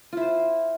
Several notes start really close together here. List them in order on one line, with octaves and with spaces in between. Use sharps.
F4 E4 C5